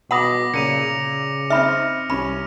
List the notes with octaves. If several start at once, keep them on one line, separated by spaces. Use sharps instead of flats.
B2 F#5 B5 D6 D#6 A#6 F#7
A#2 C#3 C#7 D#7 F7
C#3
C4 D#4 E5 B5 F6
C2 C#4 B5